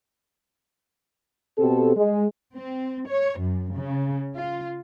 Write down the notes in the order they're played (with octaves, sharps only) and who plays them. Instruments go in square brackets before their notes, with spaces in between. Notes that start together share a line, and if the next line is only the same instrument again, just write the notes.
[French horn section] B2 C4 G4 A4
G#3
[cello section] C4
C#5
F#2
C#3
F4